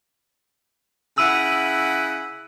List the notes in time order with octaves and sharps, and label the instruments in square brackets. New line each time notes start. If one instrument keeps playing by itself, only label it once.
[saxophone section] C#3 E4 F#5 [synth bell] E6 D#7